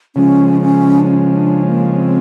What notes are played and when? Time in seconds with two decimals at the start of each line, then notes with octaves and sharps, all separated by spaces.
0.16 C#3 F3 G#3 C#4
0.62 C#4
1.00 D4
1.07 C#4
1.36 D4
1.67 A#3
1.96 C4